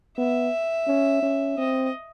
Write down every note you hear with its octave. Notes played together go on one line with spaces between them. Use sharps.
B3 E5
C#4
C#4
C4 D#5